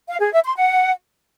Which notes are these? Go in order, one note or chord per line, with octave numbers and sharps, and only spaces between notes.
F5
G#4
E5
C6
F#5